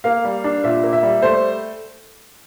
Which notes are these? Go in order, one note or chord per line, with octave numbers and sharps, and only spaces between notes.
A#3 F5
G3
D4
A#2 E5
A#3
E5
G3
A3 C5